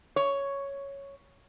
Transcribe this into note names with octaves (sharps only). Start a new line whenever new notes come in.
C#5